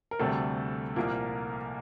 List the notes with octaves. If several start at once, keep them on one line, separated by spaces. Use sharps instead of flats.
A#4
D2 C3 G3 A3 A4
C2 A#2 F3 A#3 A#4